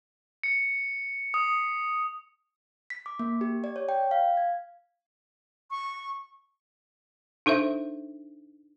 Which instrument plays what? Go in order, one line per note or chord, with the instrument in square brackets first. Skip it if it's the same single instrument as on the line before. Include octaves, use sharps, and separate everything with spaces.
[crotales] C#7
D#6
[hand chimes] B6
D6
A#3
G4
D5
C#5
G5
F5
G#6
[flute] C#6
[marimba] D4 D#4 A4 C5 E5